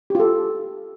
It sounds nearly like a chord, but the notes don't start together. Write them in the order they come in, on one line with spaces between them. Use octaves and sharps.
G4 F4 A4